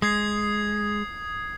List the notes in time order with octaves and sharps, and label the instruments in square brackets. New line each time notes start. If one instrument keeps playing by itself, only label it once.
[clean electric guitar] G#3 [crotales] D#6 G#6 C7